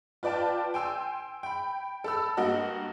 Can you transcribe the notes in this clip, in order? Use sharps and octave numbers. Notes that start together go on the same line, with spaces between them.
F4 B4 D5 G5 A5
G5 G#5 C6 E6
G5 B5
A4 B5 E6
G2 A#3 F#4 D#5